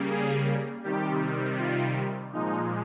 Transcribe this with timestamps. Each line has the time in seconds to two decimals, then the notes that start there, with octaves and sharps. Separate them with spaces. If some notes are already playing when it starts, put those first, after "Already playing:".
Already playing: C#3 G3 A#3
0.09 G#4
0.84 C3 D#3 G3 G4
1.58 F4
2.33 A#2 F3 G#3 D#4